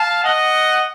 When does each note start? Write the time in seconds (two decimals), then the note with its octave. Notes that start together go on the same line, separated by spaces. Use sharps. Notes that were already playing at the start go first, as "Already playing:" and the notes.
Already playing: F5 A5
0.24 D#5 F#5